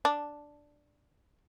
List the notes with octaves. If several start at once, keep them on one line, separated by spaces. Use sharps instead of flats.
D4